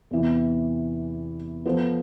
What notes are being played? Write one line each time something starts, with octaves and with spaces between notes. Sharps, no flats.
E2 C3 E3
F3 B3 F4 A4 C5